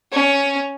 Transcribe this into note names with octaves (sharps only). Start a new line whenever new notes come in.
C#4